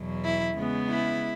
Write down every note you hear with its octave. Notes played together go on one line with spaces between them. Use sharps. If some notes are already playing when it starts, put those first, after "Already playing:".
Already playing: E2 B2 F#3
E4
C#3 G#3 B3
E4